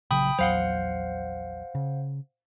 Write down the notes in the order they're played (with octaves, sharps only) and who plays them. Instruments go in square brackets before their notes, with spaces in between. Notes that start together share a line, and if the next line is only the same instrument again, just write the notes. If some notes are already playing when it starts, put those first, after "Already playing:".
[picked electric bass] A#1 C#3 F#3 [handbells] G5 B5 D#6
[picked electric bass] A#1 E2 F#3 [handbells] C5 F5 F#5
[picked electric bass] C#3